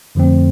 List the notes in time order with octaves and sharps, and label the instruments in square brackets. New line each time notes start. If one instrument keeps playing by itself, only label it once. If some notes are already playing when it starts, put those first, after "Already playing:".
[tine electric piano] F2 D3 F3 A3 C4